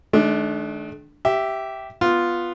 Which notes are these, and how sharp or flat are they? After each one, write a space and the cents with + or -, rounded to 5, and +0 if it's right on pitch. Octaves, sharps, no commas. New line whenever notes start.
D#3 -10 A3 -45 D4 +0
G4 -10 E5 +0
B3 +0 F4 +0